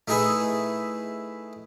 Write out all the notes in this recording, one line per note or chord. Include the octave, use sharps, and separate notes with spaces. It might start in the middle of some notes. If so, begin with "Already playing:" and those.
A3 D#4 E4 G#4 B4